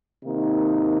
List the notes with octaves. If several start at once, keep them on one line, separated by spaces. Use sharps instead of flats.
C3 D#3 A#3 D#4